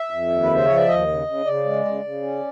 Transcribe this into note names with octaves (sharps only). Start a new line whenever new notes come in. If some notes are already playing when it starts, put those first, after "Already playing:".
Already playing: E5
F2
D#2
B4
C#3 C5
F3 C#5
D5
D#2 D#5
C#3
C#3
C#3 D5
G#3
C#3
C#3
C#4